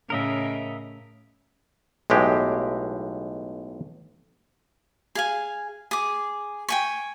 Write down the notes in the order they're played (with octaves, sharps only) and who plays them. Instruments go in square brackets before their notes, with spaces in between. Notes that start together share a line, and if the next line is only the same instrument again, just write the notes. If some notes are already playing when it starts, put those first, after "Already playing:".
[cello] A2 C#3 [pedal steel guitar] A#4 D#5 E5
[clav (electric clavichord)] B1 A2 G#3 G4
[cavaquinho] G#4 F5 G#5
G#4 D6
G5 G#5 C#6